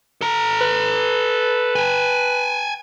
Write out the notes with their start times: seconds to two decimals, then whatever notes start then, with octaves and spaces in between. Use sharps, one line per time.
0.21 A4 A#5
0.61 B4
1.76 G5 G#5